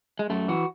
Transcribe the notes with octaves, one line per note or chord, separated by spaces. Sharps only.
G#3
F#2 A3
E3 F#4